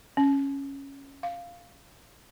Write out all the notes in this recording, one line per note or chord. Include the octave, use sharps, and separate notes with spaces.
C#4
F5